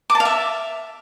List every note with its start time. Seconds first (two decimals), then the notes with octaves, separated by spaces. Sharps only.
0.10 D6
0.15 A5
0.20 F5
0.25 E5